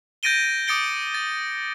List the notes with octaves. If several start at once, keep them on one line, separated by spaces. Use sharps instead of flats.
G6 A6 A#6 D7 D#7 G7
D6 D#6 A6 C#7 D7 G7
A6